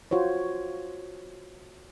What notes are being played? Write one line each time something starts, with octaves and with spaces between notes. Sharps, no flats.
F4 F#4 C5 C#5